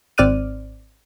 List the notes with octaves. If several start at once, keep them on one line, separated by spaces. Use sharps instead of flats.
G#1 C4 D5 F6 F#6 D#7